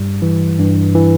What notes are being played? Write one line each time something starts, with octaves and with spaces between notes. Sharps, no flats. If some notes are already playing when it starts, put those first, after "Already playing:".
Already playing: G2 G3
E3
G2
E3